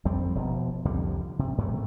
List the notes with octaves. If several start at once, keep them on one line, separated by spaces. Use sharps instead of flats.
F2 G3 C4
E1 B2 F3
C2 F2 D3 G3
C3
G#2 C3 F#3 A3